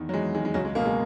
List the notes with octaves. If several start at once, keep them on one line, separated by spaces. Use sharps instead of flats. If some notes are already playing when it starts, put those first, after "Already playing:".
Already playing: E2 D#3
F#3
E2 G#3
D#3 G#3
G#3
C#2 F#3
G#3
B2 A#3
G#3